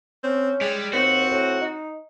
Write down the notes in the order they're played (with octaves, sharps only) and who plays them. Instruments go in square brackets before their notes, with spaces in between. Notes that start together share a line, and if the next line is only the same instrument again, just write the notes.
[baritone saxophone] C4 [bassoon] C#4
[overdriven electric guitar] G3 [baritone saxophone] G#3
[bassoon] D#2 [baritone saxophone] C4 [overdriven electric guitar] F#4
[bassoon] A2
D#4